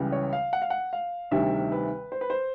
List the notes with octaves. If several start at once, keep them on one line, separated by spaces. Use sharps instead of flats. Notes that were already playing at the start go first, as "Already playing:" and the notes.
Already playing: C#2 C#3 E3 G3
C#5
F5
F#5
F5
F#5
F5
D2 C3 D#3 G3 E5
B4
C5
B4
C5